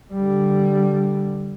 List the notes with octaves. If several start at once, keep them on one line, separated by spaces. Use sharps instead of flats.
D3 G3